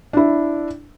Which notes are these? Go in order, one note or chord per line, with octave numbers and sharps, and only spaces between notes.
D4 E4